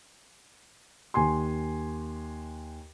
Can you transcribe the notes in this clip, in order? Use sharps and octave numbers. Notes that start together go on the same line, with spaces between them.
D#2 G#5 C6